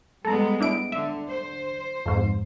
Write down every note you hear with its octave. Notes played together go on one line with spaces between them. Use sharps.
G3 G#3 B3 A4 A#5
D4 E4 D7
D3 E5
C5
F2 G#2